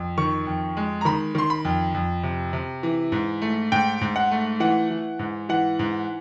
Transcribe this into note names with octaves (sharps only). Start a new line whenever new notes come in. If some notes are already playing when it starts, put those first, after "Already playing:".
Already playing: F2
D#3 C#6
F2
G#3
A#5
D#3 B5
D#3 C6
B5
F2
F2
C3
C3
E3
G#2
A3
G#2 G5
G#2
F#5
A3
E3 F#5
E3
G#2
E3 F#5
G#2